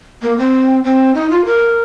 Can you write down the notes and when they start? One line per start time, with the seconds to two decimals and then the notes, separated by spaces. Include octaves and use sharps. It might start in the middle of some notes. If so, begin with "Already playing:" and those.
0.22 A#3
0.38 C4
0.84 C4
1.15 D#4
1.30 F4
1.45 A#4